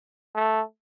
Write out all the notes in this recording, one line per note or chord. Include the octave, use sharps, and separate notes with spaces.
A3